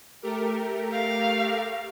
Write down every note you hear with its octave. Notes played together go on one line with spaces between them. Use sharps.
A3 G4 A#4
F5